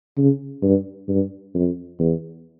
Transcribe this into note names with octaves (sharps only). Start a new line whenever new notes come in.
C#3
G2
G2
F2
E2